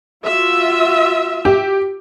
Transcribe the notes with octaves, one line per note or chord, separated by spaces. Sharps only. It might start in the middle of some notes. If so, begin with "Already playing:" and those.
F4 F#4 E5
G4